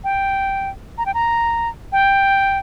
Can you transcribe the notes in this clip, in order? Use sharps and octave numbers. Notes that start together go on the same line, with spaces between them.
G5
A#5
G5
A#5
G5